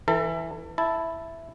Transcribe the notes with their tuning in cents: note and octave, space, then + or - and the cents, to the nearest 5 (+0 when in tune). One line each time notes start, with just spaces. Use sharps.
E3 -5 A4 +30
E4 +0 A5 +0